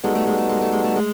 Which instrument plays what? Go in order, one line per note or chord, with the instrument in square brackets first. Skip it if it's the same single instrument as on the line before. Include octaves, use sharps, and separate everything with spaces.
[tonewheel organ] G3 B3 D#4 F#4 A4 [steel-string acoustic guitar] G#3
[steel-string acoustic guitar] A3
G#3
A3
G#3
A3
G#3
A3
G#3